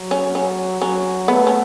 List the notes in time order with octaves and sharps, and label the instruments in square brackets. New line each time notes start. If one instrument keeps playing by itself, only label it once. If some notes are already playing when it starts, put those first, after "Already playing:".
Already playing: [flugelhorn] F#3
[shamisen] C#4
C#4
[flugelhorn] F#3 [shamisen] C#4
[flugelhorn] A3 [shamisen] B3
[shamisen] C#4